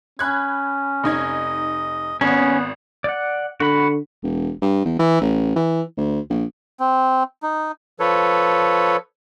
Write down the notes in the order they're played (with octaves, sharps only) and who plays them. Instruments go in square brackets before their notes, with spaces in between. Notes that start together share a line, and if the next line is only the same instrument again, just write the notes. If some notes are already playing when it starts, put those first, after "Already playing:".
[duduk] C#4 [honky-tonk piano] B5 F#6 G#6
[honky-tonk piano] F1 D#4 G#6 [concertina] D#5
[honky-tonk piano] G#1 [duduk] B3 [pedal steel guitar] C#4
[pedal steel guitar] D5 F#5
[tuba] D3 [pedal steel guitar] F#4 B5
[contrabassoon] E1
G2
E2
E3
A1
E3
D2
A#1
[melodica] C4
D#4
[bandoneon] F3 A4 B4 C#5